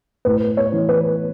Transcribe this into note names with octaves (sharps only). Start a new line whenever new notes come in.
A2 B4
C#5
E3
B4